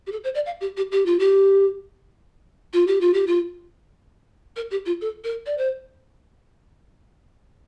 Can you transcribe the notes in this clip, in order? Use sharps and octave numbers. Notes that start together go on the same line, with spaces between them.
G4
A4
C5
D5
F5
G4
G4
G4
F4
G4
F4
G4
F4
G4
F4
A#4
G4
F4
A4
A#4
D5
C5